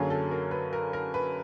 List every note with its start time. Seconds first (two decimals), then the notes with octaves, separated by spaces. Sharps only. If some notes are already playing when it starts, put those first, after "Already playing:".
Already playing: F#2 D3 F#3 A#3 G#4
0.10 A4
0.31 A#4
0.51 B4
0.73 A#4
0.93 A#4
1.14 B4